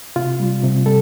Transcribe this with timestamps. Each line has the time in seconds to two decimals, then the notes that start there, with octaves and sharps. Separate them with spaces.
0.16 C3 F4
0.40 G3
0.64 C3
0.86 G3 A4